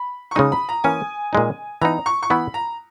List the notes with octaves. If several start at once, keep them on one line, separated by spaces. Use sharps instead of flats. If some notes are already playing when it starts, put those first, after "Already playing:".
Already playing: B5
C#6
C#3 G#3 D#4 D#6
B5
A#5
E3 A#3 C#4 G#5
A#2 G#3 D#4
E3 B3 D#4 A#5
C#6
C#6
E3 B3 E4 B5
A#5